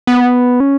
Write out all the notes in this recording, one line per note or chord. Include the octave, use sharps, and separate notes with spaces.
B3
C#4